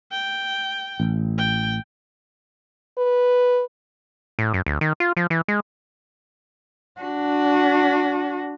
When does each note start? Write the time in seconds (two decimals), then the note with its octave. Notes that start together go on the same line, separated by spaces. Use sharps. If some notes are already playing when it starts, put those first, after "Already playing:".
0.12 G5
1.00 A1
1.38 G5
2.98 B4
4.39 A2
4.54 F#2
4.66 D2
4.81 D#3
5.00 F4
5.17 F3
5.30 E3
5.48 G#3
7.01 D4 F#4